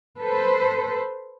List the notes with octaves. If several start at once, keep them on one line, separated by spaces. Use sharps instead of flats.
A4 B4 C5